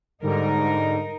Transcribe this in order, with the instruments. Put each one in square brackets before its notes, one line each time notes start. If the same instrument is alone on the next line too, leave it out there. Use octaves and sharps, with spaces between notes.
[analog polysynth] G#2 D3 G3 [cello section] D#4 A#4